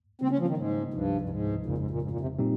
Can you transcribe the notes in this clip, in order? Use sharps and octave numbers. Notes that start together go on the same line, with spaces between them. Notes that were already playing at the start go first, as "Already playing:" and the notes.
C#3 G3 A#3 C4
C#4
F3
D#3
G#2
C#2 G2 C3 F3
G2
G#2
G1 F2 A#2 C#3 G#3
G#2
A#2
G#2
A#2
C3
A#2 G3 C4 D#4 G4